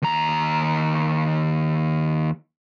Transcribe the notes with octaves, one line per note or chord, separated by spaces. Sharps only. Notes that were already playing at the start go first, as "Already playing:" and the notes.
D#2 A#5